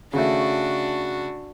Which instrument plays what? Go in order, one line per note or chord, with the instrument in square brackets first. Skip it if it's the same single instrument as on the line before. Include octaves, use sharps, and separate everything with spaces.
[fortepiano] C#3 A3 [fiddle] D4 F#4